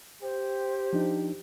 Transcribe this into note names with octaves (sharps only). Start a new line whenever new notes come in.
G4 C5
F3 D4 D#4